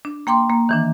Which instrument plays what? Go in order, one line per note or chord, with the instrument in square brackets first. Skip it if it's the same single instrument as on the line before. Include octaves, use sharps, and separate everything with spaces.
[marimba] D4
A#3 G5 C6 D6
A#3
D#3 E3 D4